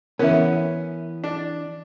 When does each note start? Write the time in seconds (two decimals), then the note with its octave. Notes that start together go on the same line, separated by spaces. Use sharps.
0.19 E3 B3 C#4 A#4 E5
1.24 D4